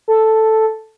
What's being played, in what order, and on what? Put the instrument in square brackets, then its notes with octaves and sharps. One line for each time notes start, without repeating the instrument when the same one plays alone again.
[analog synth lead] A4